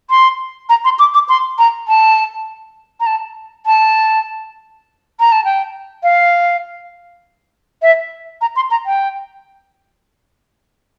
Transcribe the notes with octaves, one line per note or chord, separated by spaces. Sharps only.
C6
A#5
C6
D6
D6
C6
A#5
A5
A#5
A5
A5
A#5
A5
G5
F5
E5
A#5
C6
A#5
G5